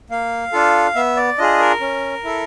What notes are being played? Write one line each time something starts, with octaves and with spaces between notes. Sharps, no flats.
A#3 F5
D4 F4 A4
B3 E5
D5
D4 F4 G#4 D#5
A#4
C#4
E4 A4